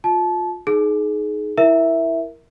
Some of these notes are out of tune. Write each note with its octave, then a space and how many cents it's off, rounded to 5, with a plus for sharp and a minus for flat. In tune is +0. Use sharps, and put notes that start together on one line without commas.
F4 +25 A5 -25
D#4 +0 G#4 +25
E4 +0 A#4 +0 E5 +0